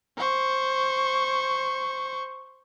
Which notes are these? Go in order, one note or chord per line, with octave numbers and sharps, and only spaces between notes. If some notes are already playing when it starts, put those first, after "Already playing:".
C5 C#6